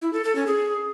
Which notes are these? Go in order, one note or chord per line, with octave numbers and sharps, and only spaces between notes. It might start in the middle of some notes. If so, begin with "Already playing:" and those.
E4
A4
A4
C#4
G#4